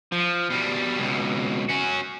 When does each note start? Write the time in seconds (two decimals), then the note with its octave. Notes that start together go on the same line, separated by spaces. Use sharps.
0.12 F3
0.50 B2 G3
0.99 C#2 B2
1.69 C#4 F#4